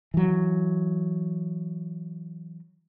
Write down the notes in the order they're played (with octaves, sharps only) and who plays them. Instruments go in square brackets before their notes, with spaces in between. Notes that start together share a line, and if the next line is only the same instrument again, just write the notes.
[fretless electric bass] E3 F#3